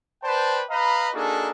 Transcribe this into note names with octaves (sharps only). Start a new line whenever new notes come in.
B4 C5 D5 G5 A5
B4 D#5 F5 A#5 B5
A#3 D4 D#4 F#4 G#4 A4